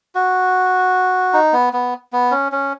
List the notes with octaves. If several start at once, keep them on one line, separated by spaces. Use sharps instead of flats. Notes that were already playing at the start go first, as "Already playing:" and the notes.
F#4
D#4
B3
B3
B3
C#4
C#4